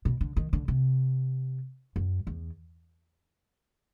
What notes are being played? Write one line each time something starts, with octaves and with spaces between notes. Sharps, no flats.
B2
D3
D#3
D3
C3
F#2
E2